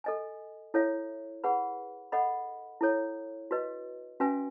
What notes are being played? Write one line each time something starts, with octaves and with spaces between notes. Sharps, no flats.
A4 D#5 G#5
E4 A4 C#5 E5
G#4 B4 F#5 B5
A4 D#5 F#5 B5
E4 A4 C#5
F#4 B4 D#5
C#4 F#4 B4 E5 G#5